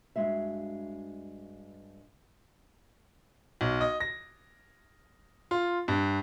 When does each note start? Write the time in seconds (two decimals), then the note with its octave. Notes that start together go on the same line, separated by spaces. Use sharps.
0.16 G2 G#3 F#4 E5
3.61 B1
3.81 D#5
4.00 A#6
5.51 F4
5.88 G2